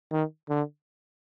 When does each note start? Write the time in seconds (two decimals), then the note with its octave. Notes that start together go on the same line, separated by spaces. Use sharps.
0.11 D#3
0.49 D3